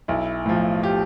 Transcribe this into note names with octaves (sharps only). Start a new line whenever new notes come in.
B1 E4
A2 F3
G4